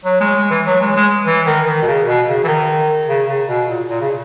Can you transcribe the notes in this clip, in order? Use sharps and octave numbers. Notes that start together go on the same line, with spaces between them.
F#3
G#3
G#3
E3
F#3
G#3
G#3
E3
D#3
D#3
B2
C#3
B2
C#3
E3
D#3
C#3
C#3
B2
A#2
A#2
C#3